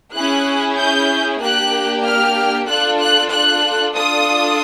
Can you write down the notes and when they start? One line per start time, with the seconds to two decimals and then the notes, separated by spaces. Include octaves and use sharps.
0.14 C#4 E4 G#4 F#6
0.77 G6
1.41 A#3 D4 G4 F#6
2.05 F6
2.68 D4 F4 A4 F#6
3.00 F#6
3.32 F#6
3.95 D4 F4 A4 D#6